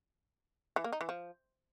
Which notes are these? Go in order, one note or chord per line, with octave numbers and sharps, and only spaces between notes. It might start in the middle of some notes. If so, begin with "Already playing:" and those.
E3
A#3
D#4
E3
F3